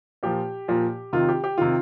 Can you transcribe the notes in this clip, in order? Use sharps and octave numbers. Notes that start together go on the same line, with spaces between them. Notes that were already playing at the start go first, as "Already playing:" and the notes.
A#2 F3 G4
A#2 F3
C3 D#3 F4
G4
G4
C3 D#3 F4